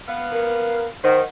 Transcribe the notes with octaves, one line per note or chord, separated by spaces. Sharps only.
B3 F5
A#4
D#3 C5 F#5